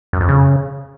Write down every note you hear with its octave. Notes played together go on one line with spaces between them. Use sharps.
F#2
F2
C#3